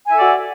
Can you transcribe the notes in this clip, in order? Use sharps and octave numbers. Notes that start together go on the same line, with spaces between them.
F#4 A4 D5 E5 G#5